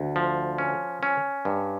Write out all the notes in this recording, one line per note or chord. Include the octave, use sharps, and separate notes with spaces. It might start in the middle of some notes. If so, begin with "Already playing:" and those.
Already playing: D2
F3
C#4
C#4
G2